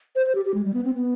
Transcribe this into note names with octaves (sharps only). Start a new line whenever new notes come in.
C5
C5
G4
G4
G#3
G3
B3
C4
B3